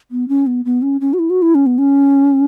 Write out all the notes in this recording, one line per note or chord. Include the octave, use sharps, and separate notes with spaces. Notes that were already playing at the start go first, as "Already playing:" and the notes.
B3
C#4
B3
B3
C#4
C#4
F#4
E4
F#4
E4
C#4
B3
C#4